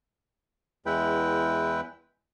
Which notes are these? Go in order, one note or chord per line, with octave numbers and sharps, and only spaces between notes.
E2 G#3 E4 B4 G5